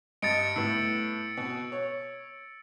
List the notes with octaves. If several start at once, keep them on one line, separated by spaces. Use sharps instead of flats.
G2 D#5 A6 C#7 D7
A2 B3 E6
B2
C#5